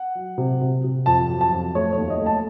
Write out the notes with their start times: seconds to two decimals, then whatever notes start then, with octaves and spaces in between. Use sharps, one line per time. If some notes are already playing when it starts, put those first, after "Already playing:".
Already playing: F#5
0.15 F#3
0.38 C3
0.61 C3
0.84 C3
1.06 F2 A5
1.29 F#3
1.41 A5
1.52 F2
1.75 A3 C#5
1.93 C#5
1.98 D#2
2.10 D#5
2.21 A3
2.26 A5